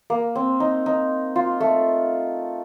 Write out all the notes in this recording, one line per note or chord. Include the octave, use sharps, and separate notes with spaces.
A#3
C4
D#4
D#4
F4
A3